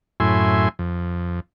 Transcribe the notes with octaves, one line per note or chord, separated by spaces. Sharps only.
F#2 A2 E4 G#5 C6
F2